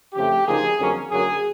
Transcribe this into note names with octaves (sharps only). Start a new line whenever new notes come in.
F2 C#3 F3 A3 G4
D2 C#3 F3 A#3 D#4 G#4
F2 D3 F#3 A#3 C#4
F#2 D3 F#3 A#3 G#4